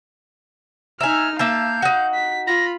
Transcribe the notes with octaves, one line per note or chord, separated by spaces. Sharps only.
D#4 E5 G#5 A#5 F6
A#3 E5 F5 A5 G6
D#4 F#4
B6
F4 B5 A#6